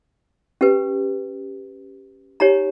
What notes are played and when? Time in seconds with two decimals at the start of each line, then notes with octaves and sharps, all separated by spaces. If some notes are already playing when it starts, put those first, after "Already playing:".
0.61 C#4 G4 B4
2.40 D#4 G4 C#5 A#5